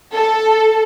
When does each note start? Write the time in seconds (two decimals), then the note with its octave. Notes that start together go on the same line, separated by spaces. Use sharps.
0.14 A4